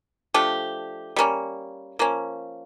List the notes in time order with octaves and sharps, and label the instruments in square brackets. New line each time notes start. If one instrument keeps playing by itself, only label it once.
[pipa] F3 A3 D4 G4
G3 A#3 C#4
F3 A#3 C#4